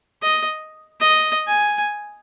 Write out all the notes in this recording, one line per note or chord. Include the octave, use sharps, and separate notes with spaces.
D#5
D#5
G#5